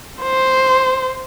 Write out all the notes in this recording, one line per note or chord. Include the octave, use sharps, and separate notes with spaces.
C5